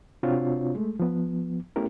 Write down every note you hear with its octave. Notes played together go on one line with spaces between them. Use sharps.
C3 C4 D4 F4 F#4 C#5
G#3 A3
F3 B3
A3 B3 C#4 E4 G4 A#4